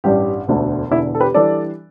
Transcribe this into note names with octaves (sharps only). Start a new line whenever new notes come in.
A1 G2 G3 D4 G4
E1 D2 D3 A3
E1 E2 D3 E4
A4
G4 B4
E3 G3 D4 A4 D5